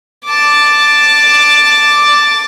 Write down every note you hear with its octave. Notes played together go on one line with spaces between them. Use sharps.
A5 D6